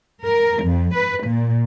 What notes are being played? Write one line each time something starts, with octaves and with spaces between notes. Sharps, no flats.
A#4
F2
B4
A#2